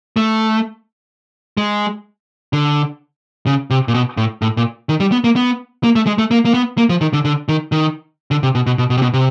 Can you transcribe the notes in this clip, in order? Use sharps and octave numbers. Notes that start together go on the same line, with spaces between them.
A3
G#3
D3
C#3
C3
A#2
B2
A2
A2
A#2
D#3
G3
B3
A#3
B3
A#3
A3
G#3
A3
A#3
A#3
B3
A#3
F3
D#3
D3
D3
D#3
D#3
D3
C3
B2
B2
B2
B2
C3
B2
C3